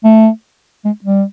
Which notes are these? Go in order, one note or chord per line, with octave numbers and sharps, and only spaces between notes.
A3
G#3
G3